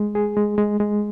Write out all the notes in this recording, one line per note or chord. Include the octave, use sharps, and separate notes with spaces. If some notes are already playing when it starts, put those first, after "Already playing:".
Already playing: G#3
G#4
G#3
G#3
G#3